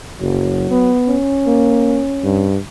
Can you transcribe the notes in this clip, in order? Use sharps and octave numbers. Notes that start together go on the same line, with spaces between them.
F#1 F#3
B3
C#4
A#3
G2